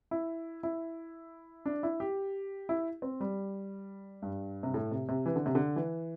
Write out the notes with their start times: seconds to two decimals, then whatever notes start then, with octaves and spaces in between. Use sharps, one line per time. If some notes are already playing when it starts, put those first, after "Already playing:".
0.11 E4
0.63 E4
1.66 D4
1.83 E4
2.00 G4
2.69 E4
3.02 C4
3.20 G3
4.22 G2
4.63 C3
4.74 A2
4.91 C3
5.09 C3
5.26 E3
5.36 D3
5.46 C3
5.55 D3
5.76 E3